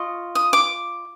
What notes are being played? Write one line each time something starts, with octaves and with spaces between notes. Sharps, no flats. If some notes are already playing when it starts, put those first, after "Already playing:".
Already playing: F4 D#5 C#6
D#6
D6